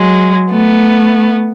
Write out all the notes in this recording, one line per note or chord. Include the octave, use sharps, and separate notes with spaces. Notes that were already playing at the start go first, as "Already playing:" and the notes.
Already playing: F#3 G#3
A3 B3